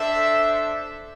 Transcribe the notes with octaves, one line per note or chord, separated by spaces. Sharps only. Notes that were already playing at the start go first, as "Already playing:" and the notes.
Already playing: D4 A4 C5 E5